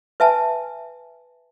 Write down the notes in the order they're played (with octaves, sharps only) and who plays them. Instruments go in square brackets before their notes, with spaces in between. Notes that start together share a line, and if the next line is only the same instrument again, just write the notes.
[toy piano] B4 E5 G#5 A5